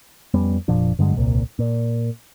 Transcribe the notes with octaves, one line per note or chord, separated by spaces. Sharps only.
F2 G3 B3 C#4
F1 A#2 F3 D4
G2 D3 F#3 G#3
D#1 C2 A#2
A#2